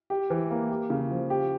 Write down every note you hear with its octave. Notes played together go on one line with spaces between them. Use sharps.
G4
E3
A#3
G4
C#3
F3
G4